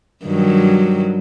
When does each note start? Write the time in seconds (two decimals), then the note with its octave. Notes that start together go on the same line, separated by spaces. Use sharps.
0.24 G2 D#3 F#3